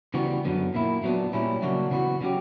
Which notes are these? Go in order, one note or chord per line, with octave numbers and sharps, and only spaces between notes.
C#3 E3 G3 B3 F#4
F#2 D3 F#3 B3
A#2 A#3 E4
A#2 F#3 B3 D4
A#2 G3 C#4 E4
C#3 F#3 A#3 D4 F#4
C#3 E3 B3 F#4
C#3 F#3 C#4 G4